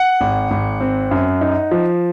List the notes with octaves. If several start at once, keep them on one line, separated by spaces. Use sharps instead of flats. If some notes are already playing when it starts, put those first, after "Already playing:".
Already playing: F#5
G#1
G#1
C4
F#2
D#4
F3